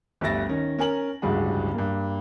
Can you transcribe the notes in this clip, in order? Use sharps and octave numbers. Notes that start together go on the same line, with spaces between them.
G1 D2 G3 E5 A6 A#6
D#3 C#4
C#4 A#4 G#5 F#7
D1 C#2 G2 G3 F#4 G#4
G2 A#3